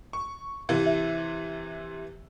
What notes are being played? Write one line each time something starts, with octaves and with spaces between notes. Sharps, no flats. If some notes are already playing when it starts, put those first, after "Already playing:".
C#6
C3 E3
E5